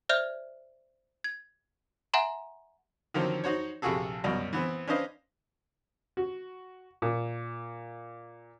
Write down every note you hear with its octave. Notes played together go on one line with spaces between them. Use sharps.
C5 D5 E5 F6 G6 F7
G#6
E5 F#5 G#5 A#5 C6
D3 D#3 F3 F#3 C4
D#4 F#4 C5 C#5
A#1 C3 F4 F#4 G#4 A4
C2 F#2 B2 D5
E3 B3 C4
C#4 D4 B4 C5 D#5 F5
F#4
A#2